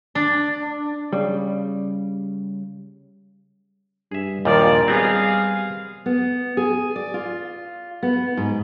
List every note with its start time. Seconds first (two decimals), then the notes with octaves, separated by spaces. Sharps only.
0.15 D4
1.12 C#3 G3
4.12 G2 G#4 E5
4.45 D#2 A#2 D#3 F3 D5
4.88 G3 B3 C4 G#4 F5
6.06 B3
6.57 G#4
6.96 D5
7.14 F4
8.03 B3
8.37 G#2